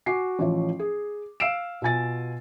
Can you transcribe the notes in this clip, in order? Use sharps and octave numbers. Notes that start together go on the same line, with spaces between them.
F#4 G#5 D6 C7
A1 F3 C#5
G#4
F5 E6 C7 D7 E7
B2 F4 G#5 A6